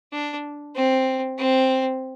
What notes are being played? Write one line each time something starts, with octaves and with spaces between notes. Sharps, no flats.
D4
C4
C4